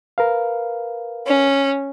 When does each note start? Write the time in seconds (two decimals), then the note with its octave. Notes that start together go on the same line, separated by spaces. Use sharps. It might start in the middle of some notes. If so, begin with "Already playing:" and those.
0.18 A#4 B4 F5
1.28 C#4